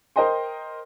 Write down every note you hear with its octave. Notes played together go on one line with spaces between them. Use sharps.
A#4 C5 D#5 G5 C6